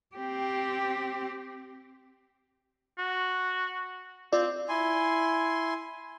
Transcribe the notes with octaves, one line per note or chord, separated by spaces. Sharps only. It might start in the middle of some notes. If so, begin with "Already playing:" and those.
C4 G4
F#4
C4 F4 D5
E4 G#5 C6